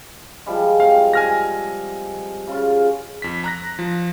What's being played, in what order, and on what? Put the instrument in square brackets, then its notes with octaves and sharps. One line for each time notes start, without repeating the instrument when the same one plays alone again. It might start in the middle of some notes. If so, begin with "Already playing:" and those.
[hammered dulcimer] F3 G3 G#3
[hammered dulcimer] C4 [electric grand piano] F5
[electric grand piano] G#5 F6 A#6
[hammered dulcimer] C#3 F4
[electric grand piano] F2 B6
A#5 F#6 A#6
F3